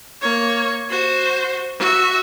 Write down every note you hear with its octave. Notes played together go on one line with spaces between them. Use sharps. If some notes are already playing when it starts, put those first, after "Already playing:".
A#3 C#5
F#4 C5
F#4 E5